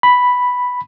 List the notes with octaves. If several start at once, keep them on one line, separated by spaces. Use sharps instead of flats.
B5